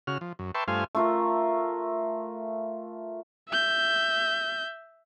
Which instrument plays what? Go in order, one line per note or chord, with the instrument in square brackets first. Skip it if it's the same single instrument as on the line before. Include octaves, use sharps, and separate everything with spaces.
[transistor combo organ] C#3 F#4 F6
F3
F#2
B4 E5 G5 A5 C6 C#6
G2 A3 F4 C5 F5 G#5
[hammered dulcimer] A3 F4 A#4
[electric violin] E5 G6